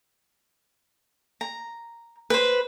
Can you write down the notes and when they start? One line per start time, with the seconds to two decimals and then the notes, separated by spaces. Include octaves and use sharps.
1.41 A#5
2.30 B4 C5